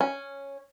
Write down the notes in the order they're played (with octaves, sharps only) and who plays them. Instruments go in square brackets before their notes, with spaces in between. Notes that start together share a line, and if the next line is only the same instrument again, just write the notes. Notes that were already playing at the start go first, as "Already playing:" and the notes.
[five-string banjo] C#4